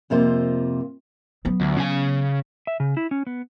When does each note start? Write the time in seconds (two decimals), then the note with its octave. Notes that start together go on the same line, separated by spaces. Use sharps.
0.10 F2 C3 A#3 F4 C5
1.45 F#3 B3
1.61 D2
1.77 C#3 G#5
2.67 E5
2.80 C#3
2.97 E4
3.11 C#4
3.27 B3